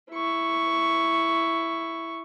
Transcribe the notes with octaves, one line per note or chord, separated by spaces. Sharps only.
E4 C#6